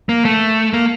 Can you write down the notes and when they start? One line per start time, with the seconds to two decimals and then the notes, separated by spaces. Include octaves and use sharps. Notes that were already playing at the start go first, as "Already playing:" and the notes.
0.09 A#3
0.25 A3
0.73 A#3